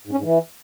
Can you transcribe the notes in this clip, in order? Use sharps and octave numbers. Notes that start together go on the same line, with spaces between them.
G#2
C#4
G#2
E3